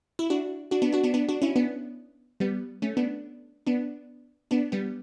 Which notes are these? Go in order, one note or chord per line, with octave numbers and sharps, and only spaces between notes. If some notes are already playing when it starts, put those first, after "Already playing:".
E4
D4 F#4
D4 F#4
B3 D4
D4 F#4
B3 D4
B3 D4
D4 F#4
C#4 E4
B3 D4
G3 B3
A3 C#4
B3 D4
B3 D4
B3 D4
G3 B3